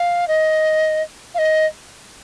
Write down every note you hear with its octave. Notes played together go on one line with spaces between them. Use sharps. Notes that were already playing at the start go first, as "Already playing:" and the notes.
Already playing: F5
D#5
F5
D#5